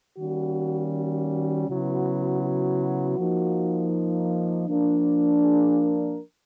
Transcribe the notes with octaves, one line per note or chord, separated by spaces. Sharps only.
D#3 G3 A#3 C#4 F#4
F#4
F#4
C#3 F#3 B3 E4 F#4
F#4
F3 A#3 D#4
F3 A#3 D4
G#4
A#4